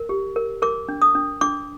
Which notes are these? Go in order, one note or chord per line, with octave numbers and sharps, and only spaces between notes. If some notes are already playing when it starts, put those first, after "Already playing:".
Already playing: A#4
G4
A#4
A#4 D6
D4
D#6
D4
D4 D6